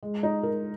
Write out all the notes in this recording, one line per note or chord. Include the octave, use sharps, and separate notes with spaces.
G#3
D#4
A#4